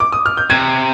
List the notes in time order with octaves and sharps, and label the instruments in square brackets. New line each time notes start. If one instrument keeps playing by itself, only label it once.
[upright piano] D6
D#6
F6
G6
[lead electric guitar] C3 [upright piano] G#6